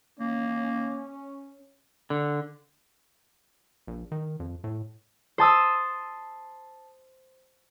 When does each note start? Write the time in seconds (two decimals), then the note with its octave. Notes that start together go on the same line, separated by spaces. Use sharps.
0.19 A#3 C#4
2.10 D3
3.87 A#1
4.12 D#3
4.40 F2
4.64 A2
5.38 C5 A5 D#6 E6